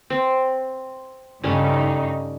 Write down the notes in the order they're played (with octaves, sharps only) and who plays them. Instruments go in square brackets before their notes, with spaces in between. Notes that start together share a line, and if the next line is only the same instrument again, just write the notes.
[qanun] C4
[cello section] G2 C#3 D#4 [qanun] G3 A3 C#4